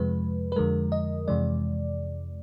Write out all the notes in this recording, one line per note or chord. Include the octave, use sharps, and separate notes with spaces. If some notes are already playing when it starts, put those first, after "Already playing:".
Already playing: F2 C3 F3 G#3 B4
B4
F2 D3 F3 G#3 A#4
D#5
F2 C3 E3 G#3 D5